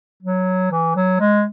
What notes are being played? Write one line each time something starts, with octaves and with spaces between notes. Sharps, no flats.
F#3
E3
F#3
G#3